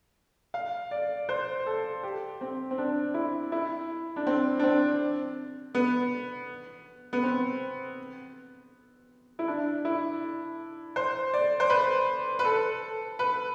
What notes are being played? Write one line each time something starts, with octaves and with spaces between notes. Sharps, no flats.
F5
D5
C5
A4
G4
C4
C4
D4
E4
E4
D4
C4
D4
C4
B3
B3
C4
E4
D4
E4
C5
D5
C5
B4
B4
A4
B4